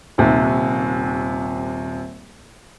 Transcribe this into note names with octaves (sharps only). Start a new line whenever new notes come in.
D#1 D#2 C3